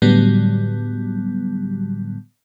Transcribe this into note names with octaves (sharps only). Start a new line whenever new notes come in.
A2 D3 F#3 G3 B3